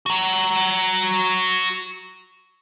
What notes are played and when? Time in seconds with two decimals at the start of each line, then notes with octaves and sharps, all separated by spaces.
0.06 F#4 A#5